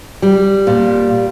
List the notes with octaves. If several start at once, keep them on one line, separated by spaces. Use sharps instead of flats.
G3
A#2